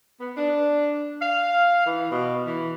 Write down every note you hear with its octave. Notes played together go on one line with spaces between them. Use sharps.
B3
D4
F5
E3
B2
E3